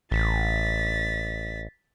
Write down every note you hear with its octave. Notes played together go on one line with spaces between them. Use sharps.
A1 A6 B6